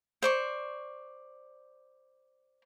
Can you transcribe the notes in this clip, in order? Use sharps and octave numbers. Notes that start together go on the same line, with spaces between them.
C5 D5 C#6